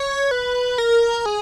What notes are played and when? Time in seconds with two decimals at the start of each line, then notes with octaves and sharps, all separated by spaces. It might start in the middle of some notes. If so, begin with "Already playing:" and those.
Already playing: C#5
0.31 B4
0.78 A#4
1.26 G#4